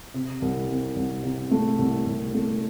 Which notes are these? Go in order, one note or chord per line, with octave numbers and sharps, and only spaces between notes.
C3
C2
C3
C2
C3
A3
C2
C2
A3